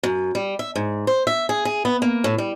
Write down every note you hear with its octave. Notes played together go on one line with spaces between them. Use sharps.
F#2
G3
E5
G#2
C5
E5
G#4
G#4
B3
A#3
A2
G3